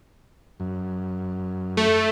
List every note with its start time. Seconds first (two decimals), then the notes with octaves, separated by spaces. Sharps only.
0.60 F#2
1.77 A3